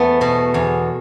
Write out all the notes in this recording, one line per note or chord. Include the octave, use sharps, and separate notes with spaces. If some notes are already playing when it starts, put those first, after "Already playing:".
Already playing: E2 A3 B3
B2
E2